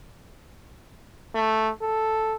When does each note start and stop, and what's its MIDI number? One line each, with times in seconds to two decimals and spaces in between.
1.35 1.71 57
1.82 2.36 69